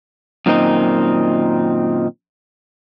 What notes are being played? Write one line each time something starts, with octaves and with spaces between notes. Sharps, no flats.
F#2 A#2 D#3 C4 D#4